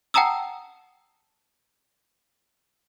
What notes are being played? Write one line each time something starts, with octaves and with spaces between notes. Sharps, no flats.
F#5 G5 A5 A#5 D#6 E6